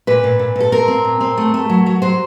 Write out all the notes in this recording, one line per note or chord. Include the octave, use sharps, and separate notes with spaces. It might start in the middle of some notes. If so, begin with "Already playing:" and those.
A#2 B4
A#2
A#2
A#2 A4
C4 A#4
C4
A#2
C4
A3
A3
F#3
F#3
F#3 C5